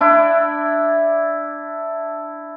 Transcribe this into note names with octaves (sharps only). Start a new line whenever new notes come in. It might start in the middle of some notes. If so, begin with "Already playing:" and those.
D4 E4